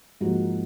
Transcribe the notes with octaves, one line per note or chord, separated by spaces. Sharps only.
G#2 F3 A#3 F#4